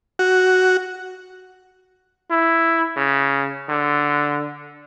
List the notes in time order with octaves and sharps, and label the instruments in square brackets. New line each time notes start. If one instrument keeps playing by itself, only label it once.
[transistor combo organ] F#4
[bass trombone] E4
C#3
D3